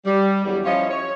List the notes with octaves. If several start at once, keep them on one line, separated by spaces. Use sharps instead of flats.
G3
E2 D3 F#3 G3
F3 C#4 E4 F4 C#5 D#5
C#5